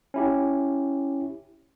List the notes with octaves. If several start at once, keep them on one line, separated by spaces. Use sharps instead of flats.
C#4 E4 G4